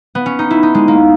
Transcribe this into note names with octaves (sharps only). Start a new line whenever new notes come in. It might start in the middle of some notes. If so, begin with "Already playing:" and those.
B3
C#4
D#4
E4
D#4
G#3
A#3